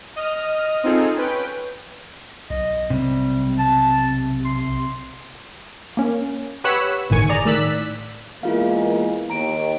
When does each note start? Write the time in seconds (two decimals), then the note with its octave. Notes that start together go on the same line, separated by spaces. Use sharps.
0.16 D#5 D#6 F6
0.84 C4 D#4 F4 G#4 A4
1.16 C#4 B4 G5
2.50 B1 D#5
2.90 C3 G3
3.58 A5
4.45 C6
5.97 A#3 C#4
6.64 G4 B4 C#5 F#5 B5 E6
7.10 G1 A2 D#3 G#5 C#6
7.29 G#4 D5 A#5
7.45 A2 D#3 D5 E6 F#6 B6
8.43 E2 G#3 A#3 E4 F4 F5
9.30 D#2 A#5 D7